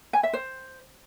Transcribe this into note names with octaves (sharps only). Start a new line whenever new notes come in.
G#5
E5
C5